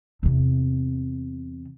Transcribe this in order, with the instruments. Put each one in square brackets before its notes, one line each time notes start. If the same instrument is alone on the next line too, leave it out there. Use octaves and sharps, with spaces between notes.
[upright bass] E2 C3